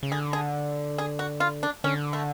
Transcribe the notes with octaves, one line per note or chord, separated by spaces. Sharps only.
C#3
D3 G#4
G#4
G#4
F#4
F4
D4
D3 C#4
A3